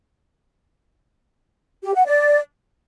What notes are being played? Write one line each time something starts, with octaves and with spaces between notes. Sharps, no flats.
G4
F#5
D5